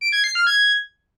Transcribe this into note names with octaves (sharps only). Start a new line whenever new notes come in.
D7
G#6
C7
F6
G#6